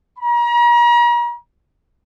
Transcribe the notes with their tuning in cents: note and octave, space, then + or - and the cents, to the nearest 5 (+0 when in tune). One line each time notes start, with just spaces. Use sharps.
A#5 +40